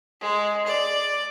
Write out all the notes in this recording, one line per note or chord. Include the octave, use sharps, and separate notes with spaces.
G#3
D5